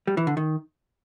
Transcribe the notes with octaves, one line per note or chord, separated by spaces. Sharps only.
G3
E3
D3
D#3